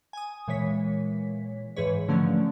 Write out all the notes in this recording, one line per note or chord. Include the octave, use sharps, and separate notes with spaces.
G#5 D#6
A#2 E3 G#3 C#5 B6
G#2 E3 G#4 B4 C#5
D3 F3 F#3 A3 A#3 C#4